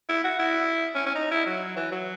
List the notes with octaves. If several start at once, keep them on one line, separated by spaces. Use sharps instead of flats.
E4
F#4
E4
C#4
C#4
D#4
E4
F#3
E3
F#3